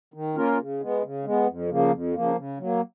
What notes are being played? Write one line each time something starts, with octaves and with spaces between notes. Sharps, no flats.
D#3
A#3 C#4 F4 A#4
C#3
G#3 B3
C#3
G#3 B3
F2
C#3 F3 A#3
F2
C#3 F3 A#3
C#3
F#3 A#3